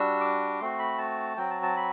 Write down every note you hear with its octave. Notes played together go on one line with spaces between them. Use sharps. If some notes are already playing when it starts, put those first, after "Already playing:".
Already playing: G3 D4 F#4 E6
D6
A3 C4 F#4 C6
B5
A5
F#3 C4 F#4 G5
A5
A5
B5